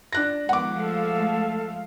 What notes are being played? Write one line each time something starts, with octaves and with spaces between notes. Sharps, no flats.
D4 F#6 A#6
D#3 F3 G#3 B3 F#5 D6
A3 A4 F5